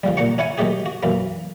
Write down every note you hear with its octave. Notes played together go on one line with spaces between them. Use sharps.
D3 F3 G3
A#2 A#4 F#5 C#6
C#4 E4 F#5 G#5
D#3 F#3 A3 G4 G#4
F#4
B1 F#2 E3 A#3